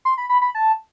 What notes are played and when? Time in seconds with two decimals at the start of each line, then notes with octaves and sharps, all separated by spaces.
0.05 C6
0.18 B5
0.29 B5
0.42 B5
0.55 A5